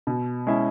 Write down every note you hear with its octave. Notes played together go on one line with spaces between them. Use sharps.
B2
G#3 C#4 E4